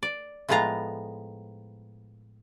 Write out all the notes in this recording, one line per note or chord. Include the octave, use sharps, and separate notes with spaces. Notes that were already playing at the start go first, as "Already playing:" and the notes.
D5
A2 F3 G#3 B3 F4 A#5